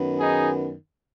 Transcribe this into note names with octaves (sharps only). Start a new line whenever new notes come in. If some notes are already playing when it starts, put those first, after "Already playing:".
Already playing: F#2 D#3 B3
D#4 G#4